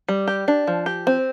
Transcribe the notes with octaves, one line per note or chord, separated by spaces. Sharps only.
G3
G4
D4
F3
G4
C4